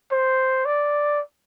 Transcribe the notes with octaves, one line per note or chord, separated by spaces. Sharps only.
C5
D5